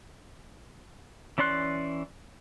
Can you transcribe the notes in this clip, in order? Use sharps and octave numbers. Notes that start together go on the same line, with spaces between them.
E3 C#4 D5 C6 F#6